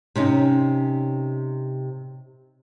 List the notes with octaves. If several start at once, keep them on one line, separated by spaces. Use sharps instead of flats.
C3 C#4 D#4